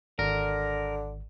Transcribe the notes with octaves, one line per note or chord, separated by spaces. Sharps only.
G#1 D3 A#4